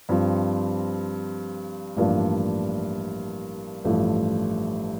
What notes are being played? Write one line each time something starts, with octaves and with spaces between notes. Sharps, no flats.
G2 F3 C4
A1 G2 F3 A#3 D4
A1 G2 F3 A3